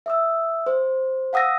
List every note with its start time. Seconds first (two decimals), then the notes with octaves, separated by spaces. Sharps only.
0.06 E5 D#6 E6
0.66 C5
1.33 F5 F#5 D#6 E6 A#6